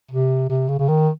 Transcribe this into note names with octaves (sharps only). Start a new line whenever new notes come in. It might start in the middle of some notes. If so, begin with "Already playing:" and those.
C3
C3
C#3
C#3
D#3